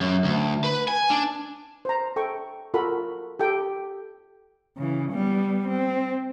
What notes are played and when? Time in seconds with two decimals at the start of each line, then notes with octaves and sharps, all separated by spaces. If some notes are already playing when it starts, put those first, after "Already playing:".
0.01 F#2
0.24 D2
0.64 B4
0.88 G#5
1.10 D4
1.85 C5 A#5
2.16 A4 G5 C#6
2.74 F4 F#4 A4 A#4 B5
3.39 G4 A4 G5
4.77 C#3 E3
5.11 G3 B3
5.68 C4